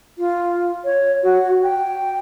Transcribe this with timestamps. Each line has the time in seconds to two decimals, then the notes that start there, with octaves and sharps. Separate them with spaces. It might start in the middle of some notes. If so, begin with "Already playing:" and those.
0.18 F4
0.84 C#5
1.23 F#4
1.63 G5